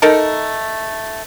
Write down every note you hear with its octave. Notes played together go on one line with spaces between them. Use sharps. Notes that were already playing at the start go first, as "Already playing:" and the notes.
A3 D#4 A4 A#4